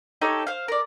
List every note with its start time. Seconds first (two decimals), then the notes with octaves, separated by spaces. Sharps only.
0.21 D#4 G4 A4 C#5
0.47 C5 F5
0.68 A#4 D5